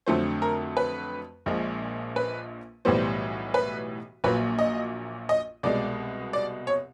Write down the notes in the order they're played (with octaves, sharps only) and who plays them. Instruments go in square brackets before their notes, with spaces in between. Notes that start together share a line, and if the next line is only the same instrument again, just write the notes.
[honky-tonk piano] F2 D3 F#3 A3 C5
A#4
B4
A#1 A#2 F3 G#3
B4
B1 A2 E3 G3 B3 C5
B4
A#1 A#2 F#3 A#3 B4
D#5
D#5
C2 B2 G#3 D5
D5
C#5